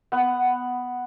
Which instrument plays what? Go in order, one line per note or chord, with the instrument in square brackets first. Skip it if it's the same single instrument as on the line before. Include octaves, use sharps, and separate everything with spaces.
[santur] B3 F#5